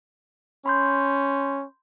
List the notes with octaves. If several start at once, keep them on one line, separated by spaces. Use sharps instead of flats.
C#4 B5 C6 G6